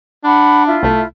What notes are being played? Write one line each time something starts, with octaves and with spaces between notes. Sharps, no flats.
D4 F#5 B5
E4 F4
C2 A3